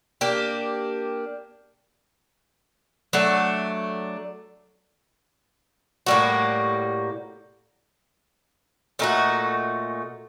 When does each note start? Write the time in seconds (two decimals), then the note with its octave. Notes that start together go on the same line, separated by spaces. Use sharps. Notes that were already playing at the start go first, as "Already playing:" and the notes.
0.21 A#3 D4 G4
3.13 F#3 A3 D4 A4
6.06 A2 G3 A#3 F#4
8.99 A#2 A3 D#4 F#4